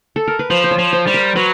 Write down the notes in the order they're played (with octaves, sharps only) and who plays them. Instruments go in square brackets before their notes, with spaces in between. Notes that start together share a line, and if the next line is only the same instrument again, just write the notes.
[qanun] A4
A#4
B4
[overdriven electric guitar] F3 [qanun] C5
[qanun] C5
C#5
[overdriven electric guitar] F3
[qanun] C5
[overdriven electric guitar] G3
[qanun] A#4
[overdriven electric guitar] F#3 [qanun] B4